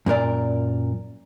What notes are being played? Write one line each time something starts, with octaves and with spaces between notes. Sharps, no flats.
F#2 A#2 A#4 D5